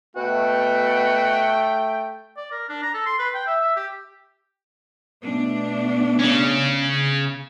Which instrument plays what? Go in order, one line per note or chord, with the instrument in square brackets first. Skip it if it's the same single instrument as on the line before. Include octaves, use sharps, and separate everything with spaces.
[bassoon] B2 [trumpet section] A3 G5 [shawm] F#4
[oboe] D5
A#4
D4
A#5
A4
C6
B4
G5
E5
E5
G4
[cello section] B2 A3 D4
[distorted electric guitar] C#3 C#4